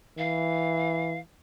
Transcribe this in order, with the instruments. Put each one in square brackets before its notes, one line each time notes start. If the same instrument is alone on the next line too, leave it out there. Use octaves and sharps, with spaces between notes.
[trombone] E3 [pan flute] F5